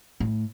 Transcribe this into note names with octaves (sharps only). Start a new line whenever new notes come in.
A2